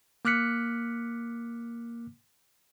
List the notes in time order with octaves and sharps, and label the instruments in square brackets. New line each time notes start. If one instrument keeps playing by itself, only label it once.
[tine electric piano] A#3 D6 F6 F#6 B6 C#7